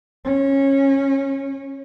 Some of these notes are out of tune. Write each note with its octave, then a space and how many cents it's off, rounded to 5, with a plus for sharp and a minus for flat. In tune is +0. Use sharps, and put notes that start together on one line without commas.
C#4 -20